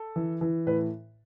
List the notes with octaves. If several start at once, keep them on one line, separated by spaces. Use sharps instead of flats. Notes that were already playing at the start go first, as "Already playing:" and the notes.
Already playing: A4
E3
E3
A2 B4